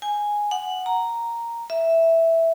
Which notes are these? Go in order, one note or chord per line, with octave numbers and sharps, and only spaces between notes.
G#5
F#5
A#5
E5